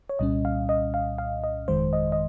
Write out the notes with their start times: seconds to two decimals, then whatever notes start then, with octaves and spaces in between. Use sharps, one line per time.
0.09 C#5
0.19 C2 A#2 G3 C#4 D#5
0.45 F5
0.69 D#5
0.94 F5
1.18 F5
1.44 D#5
1.68 G1 F2 D#3 G#3 C5
1.93 D#5
2.12 D#5